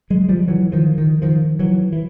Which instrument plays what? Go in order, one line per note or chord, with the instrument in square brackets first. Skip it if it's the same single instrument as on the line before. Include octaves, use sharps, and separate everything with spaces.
[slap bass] F#3 G#3
F3 G3
E3 F#3
D#3 F3
D#3
D#3 F3
E3 F#3
E3